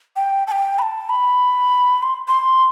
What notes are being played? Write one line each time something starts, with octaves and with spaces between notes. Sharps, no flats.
G5
A5
G5
B5
A5
B5
C6
C6